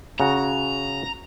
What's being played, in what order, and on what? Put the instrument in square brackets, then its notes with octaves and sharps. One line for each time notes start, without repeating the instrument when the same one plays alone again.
[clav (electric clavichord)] C#3 F#4 [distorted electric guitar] A#5